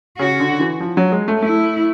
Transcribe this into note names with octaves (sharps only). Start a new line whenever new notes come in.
C#3 F#4
D3
E3
F3
F#3
G#3
A3
A3 E4